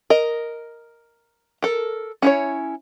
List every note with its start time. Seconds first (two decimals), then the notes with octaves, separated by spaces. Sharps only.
0.10 A#4 D#5
1.62 A4 A#4
2.22 C#4 E4 C#5